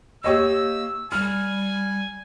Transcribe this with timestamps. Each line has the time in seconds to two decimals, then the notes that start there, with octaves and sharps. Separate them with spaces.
0.24 A#3 G4 C#5 D#5 E6
1.12 G3 G#5 F6